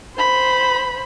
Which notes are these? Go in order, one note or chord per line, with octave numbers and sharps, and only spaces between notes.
C5 B5